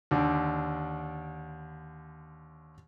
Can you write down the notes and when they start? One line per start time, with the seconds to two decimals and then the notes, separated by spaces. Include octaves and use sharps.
0.11 D#2 D3 D4